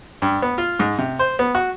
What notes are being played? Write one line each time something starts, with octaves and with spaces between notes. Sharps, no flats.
G2
B3
F4
G#2
C3
C5
B3
F#4